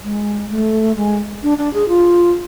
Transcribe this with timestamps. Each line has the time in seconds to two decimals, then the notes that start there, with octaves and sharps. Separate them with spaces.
0.04 G#3
0.50 A3
0.96 G#3
1.43 D4
1.58 D4
1.74 G#4
1.89 F4